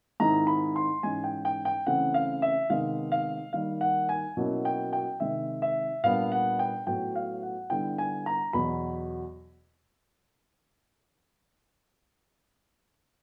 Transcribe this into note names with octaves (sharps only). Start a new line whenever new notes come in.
G#2 D#3 G#3 C4 E4 A#5
B5
C6
G#2 E3 G#3 C#4 G#5
G5
G5
G5
C#3 E3 A3 C4 F#5
F5
E5
C3 D#3 G#3 B3 F5
F5
D#3 G3 A#3 F5
F#5
G#5
B2 F#3 A#3 C#4 E4
G5
G5
C3 D#3 G#3 E5
E5
A#2 G3 B3 D4 F5
F#5
G5
A2 F#3 B3 G5
F5
F#5
D3 G3 B3 E4 G5
G#5
A#5
E2 B2 F#3 B5